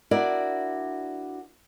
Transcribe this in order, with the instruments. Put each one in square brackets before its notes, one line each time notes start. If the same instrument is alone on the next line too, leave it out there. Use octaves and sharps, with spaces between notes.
[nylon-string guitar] D4 E4 F#4 A#4 D5